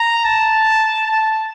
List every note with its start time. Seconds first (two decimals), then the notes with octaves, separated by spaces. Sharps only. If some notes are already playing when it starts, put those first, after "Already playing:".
Already playing: A#5
0.25 A5
1.07 A5